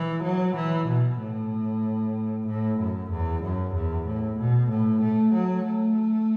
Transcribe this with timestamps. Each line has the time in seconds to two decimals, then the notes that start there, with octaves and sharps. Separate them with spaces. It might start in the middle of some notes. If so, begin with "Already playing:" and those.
Already playing: E3
0.23 F#3
0.56 E3
0.87 B2
1.20 A2
2.47 A2
2.79 F#2
3.11 E2
3.43 F#2
3.74 E2
4.07 A2
4.39 B2
4.70 A2
5.02 A3
5.34 F#3
5.66 A3